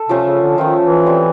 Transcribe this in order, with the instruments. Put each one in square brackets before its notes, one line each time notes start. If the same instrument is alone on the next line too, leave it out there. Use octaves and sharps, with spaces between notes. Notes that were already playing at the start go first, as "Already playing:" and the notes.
Already playing: [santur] A4
[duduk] C3 [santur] F3 A3 C#4
[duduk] C#3
D3
[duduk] D#3 [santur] F3 A3 C#4
[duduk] E3
[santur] G3 C4 E4